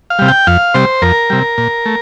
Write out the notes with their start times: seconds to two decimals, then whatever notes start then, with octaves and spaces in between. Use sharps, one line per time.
0.10 F5
0.19 C3 G3
0.28 G5
0.47 F2 F5
0.74 C3 G3 C5
1.02 F2 A#4
1.30 C3 G3
1.58 A#2
1.86 A3